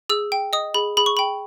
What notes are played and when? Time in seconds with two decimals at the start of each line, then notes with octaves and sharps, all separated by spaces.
0.09 G#4 E6
0.32 G5
0.53 D#5 D#6
0.74 G#4 B5
0.97 G#4 B5
1.06 C#6
1.17 G5 B5